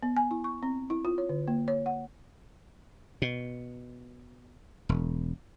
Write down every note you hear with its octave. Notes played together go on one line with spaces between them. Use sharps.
B3
G#5
E4
C#6
C4
E4
F4
C#5
D3
A#3
C#5
F#5
B2
E1